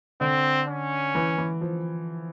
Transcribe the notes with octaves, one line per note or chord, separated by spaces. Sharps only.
D3 C4
C#4
E3
E3
F3